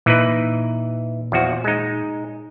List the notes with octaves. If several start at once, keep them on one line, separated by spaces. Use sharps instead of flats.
A#2 E3 D#4 B4
E2 F3 F#4
G#3 D#4